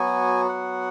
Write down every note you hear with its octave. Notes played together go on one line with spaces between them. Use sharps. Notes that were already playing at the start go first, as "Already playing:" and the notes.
Already playing: F#3 B3 F#4 G#5
F#5